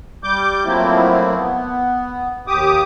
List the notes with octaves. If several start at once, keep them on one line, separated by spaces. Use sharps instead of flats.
G3 D6 G6
F3 F#3 A3 A#3 C4 E4
B3
D#2 G4 D6 D#6